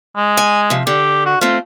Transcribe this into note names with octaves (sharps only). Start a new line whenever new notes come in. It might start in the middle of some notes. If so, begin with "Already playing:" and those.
G#3
G#5
C3 F3
D3 G4
F#4
A3 C4 F4